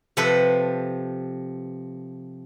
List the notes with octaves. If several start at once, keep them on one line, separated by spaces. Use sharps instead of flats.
C3 F3 A4 B4 C5